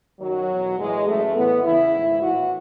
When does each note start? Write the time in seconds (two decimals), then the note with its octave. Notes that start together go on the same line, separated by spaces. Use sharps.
0.20 F#2 D#3 F#3
0.49 E2 B2
0.78 A2 E3 G#3
1.06 F#2 E3 A3
1.35 A2 E3 B3
1.63 E2 C#3 E3 E4
1.92 G#2 D#3
2.21 A2 E3 F#4